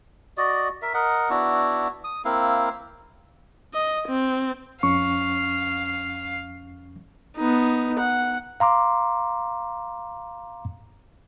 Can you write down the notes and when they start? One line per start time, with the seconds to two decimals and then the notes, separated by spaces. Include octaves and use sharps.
0.37 F#4 D5 D#5
0.82 A#4 E5
0.94 A#4 D#5 F#5
1.30 B3 D4 E4 F#4
2.04 D#6
2.25 A#3 C4 E4 F5
3.74 D#5
4.09 C4
4.83 F2 C#4 F5 C#6
7.36 B3 D#4
7.99 F#5
8.60 F5 A#5 C6 D6